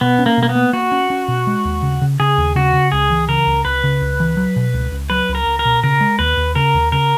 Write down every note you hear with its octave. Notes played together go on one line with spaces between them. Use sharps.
B2 B3
C#4
A#3
B2 A#3
B3
A#3
A#3 F#4
C#4
C#4
B2
G#3
D#2
C#3
C#3
C#3 G#4
D#2
C#3 F#4
C#3
C#2 G#4
E3
C#3 A#4
C#2
C#2 B4
C#3
C#2
E3
F#3
B2
C#2
C#2
F#3 B4
C#2
A#4
C#2
A#4
B2
C#3 A#4
G#3
D#2 B4
D#2
C#3 A#4
D#2
C#3 A#4